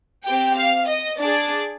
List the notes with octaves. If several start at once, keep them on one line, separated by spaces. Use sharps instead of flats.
C4 G4 G5
F5
D#5
D4 G#4 D5